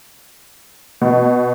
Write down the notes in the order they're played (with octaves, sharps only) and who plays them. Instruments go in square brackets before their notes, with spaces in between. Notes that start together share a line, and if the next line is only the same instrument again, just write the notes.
[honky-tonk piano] B2